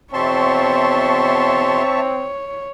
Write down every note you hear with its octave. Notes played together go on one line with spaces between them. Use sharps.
E2 B2 C4 C#5 E5 A5 C6 C#6